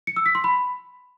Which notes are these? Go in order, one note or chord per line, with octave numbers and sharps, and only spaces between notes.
C#7
E6
B6
C6
B5